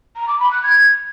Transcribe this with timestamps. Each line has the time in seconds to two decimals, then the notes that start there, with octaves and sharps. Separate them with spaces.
0.16 A#5
0.27 D6
0.39 B5
0.51 F#6
0.63 G#6